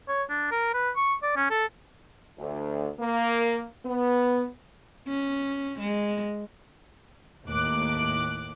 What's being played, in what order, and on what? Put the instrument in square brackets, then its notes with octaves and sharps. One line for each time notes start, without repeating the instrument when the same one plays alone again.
[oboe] C#5
D4
A#4
B4
C#6
D5
C#4
A4
[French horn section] D2
A#3
B3
[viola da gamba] C#4
G#3
[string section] D#2 A2 D6 F#6